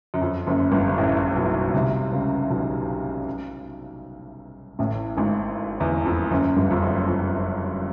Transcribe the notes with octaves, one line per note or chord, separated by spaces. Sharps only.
F#2
F2
F#1 F#2
G1 G2
A1 A2
B1 B2
C2 C3
C#2 C#3
B1 B2
A1 A2
G#1 G#2
E2
F2
F#1 F#2
G1 G2
F2
F#1 F#2
F2